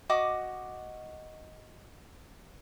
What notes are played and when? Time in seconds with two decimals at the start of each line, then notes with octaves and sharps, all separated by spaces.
0.09 F#4 D#5 D6 D#6